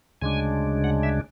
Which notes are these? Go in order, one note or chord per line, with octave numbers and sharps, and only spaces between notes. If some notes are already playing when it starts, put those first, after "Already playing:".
D2 C#3 G#3 D4 G#5
F#5
E5